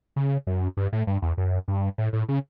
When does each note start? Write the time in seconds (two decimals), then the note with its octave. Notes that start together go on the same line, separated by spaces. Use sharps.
0.16 C#3
0.47 F#2
0.77 G2
0.93 A2
1.07 G2
1.22 E2
1.38 F#2
1.68 G2
1.98 A2
2.13 A2
2.28 C#3